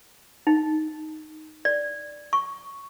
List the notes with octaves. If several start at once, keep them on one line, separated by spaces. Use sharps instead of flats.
D#4
D5
C#6